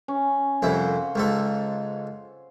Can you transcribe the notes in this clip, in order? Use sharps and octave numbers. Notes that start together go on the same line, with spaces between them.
C#4
C2 F2 E4 C5 F5 F#5
C#2 G#2 A4